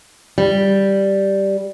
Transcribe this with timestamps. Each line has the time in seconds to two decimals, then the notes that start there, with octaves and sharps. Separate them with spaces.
0.38 G3